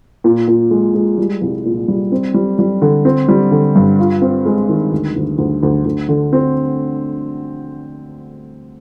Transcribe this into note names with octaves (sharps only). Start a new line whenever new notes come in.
A#2
A#2
G#3
G#3
G3
C2
A#2
G3
C4
G3
G3
D3
C4
G3
D3
G2
F4
C4
G#3
D#3
D2
D2
D2
D2
D2
D3
C4